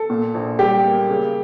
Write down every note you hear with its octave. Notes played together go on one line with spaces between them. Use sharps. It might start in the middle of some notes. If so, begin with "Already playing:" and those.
Already playing: A4
A#2
A#1
G3 G4
A#3
C#3